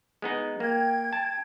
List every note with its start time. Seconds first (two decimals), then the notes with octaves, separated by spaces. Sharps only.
0.22 G#3 B3 D#4
0.60 A#3 G5 G#6
1.13 A5